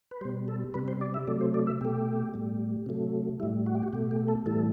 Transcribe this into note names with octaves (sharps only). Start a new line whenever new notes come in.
B4
B2 G3 C5
A4
C3 G3 B4
C5
D5
E5
C3 F#3 A3 D5
C5
D5
E5
B2 A3 G4
A2 G3
C3 F#3 A3
A2 G3 E4
F#4
G4
F#4
B2 A3 G4
G4
A4
A2 E3 G3 A4